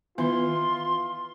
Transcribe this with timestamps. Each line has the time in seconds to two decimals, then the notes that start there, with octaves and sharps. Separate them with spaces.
0.18 D#3 E3 B3 F4 C6